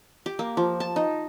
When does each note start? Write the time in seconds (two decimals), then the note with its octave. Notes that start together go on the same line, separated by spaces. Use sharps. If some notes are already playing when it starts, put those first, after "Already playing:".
0.26 G4
0.39 A#3
0.57 F3
0.80 A5
0.96 D#4